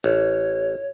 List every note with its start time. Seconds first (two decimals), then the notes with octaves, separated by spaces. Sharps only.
0.04 A1 C#5